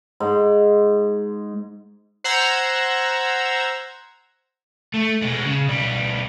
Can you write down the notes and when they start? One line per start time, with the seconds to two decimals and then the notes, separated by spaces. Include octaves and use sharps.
0.20 G#2
2.24 C5 F#5 A#5 E6 G#6
4.94 A3
5.22 B2 G#3
5.46 C#3
5.68 B1 G3